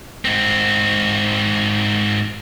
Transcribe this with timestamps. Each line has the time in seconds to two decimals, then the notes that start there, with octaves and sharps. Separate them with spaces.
0.25 G#2 C4